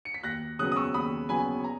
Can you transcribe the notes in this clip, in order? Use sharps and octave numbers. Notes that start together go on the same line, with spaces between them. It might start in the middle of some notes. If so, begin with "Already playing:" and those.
C#7
B6
D#2 F#6 A#6
C#3 F#3 B3 D#6 F#6
D#6
C#6 E6
D#2 B5 D#6
C#3 F#3 B3 G#5 B5
A#5